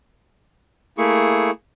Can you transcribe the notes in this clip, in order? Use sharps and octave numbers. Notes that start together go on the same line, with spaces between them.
A3 A#3 E4 G#4 C#6